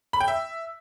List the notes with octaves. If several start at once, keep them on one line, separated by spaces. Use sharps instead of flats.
B5
G5
E5